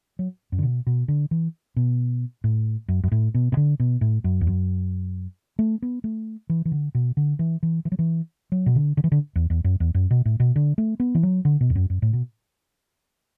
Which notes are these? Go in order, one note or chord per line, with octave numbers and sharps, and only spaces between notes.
F#3
F#2
D3
B2
B2
D3
E3
B2
A2
F#2
F#2
A2
B2
B2
D3
B2
A2
F#2
E2
F#2
A3
B3
A3
E3
E3
D3
B2
D3
E3
E3
E3
F#3
E3
F#3
B2
D3
D3
E3
D3
E2
E2
F#2
E2
F#2
B2
A2
B2
D3
A3
B3
E3
F#3
D3
B2
E2
F#2
F#2
A2
B2